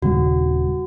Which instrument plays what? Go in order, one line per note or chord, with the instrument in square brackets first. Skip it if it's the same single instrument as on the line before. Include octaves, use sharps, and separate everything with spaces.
[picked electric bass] D#1 C#3 G3 [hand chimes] F#4